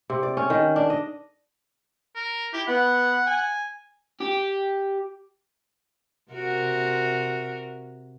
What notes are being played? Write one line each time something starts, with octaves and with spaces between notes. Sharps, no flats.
C3
D5
C#4
D#3
D4
D#5
A#4
E4 G4
B3 F#5
G#5
G4
C3 F#4 A#4